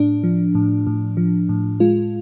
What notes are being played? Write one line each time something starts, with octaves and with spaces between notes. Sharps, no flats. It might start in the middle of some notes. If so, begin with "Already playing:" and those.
Already playing: A2 D4
F3
A2
A2
F3
A2
G#3 F4